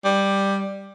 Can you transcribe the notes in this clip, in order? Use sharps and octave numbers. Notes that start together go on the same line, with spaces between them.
G3